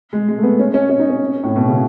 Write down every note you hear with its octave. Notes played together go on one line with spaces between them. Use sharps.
G#3
G#3
A3
B3
C#4
C#4
C#4
D#4
C#4
A2
B2
C#3